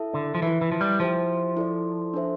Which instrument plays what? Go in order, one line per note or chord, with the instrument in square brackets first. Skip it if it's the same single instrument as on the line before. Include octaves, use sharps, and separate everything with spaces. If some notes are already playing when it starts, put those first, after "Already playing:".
Already playing: [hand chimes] E4 A4 E5 A5
[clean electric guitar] D3
F3
[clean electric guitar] E3 [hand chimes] E4 B4 E5
[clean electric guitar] E3
F3
G3
[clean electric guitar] F3 [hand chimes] E4 G4 C5 E5 G5
[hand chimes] E4 A4 D5
D4 A4 C5 E5